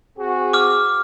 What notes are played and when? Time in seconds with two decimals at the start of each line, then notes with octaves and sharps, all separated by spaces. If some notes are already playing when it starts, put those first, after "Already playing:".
0.18 C4 F#4 G#4
0.53 D6 F6